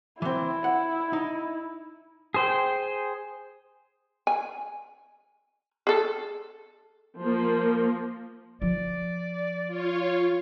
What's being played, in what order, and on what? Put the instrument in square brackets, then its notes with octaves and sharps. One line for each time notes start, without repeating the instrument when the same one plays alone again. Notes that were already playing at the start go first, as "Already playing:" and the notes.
[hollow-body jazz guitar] E3 C4 [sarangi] E4
[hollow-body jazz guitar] F#5
D#4
[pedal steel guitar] G#4 C5 G5
[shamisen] G#5
G#4 A4
[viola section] F3 A#3
[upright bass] F3 [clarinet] D5
[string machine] F4 C#5